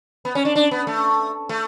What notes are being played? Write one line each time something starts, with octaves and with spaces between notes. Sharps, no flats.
B3
C#4
D4
D4
B3
A3
A3